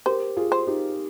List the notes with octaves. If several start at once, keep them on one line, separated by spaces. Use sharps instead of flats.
G4 A#4 C5
F4 G#4
C5
D#4 G4